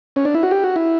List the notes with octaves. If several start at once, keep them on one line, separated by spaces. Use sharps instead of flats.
C#4
D4
E4
F#4
G4
F#4
E4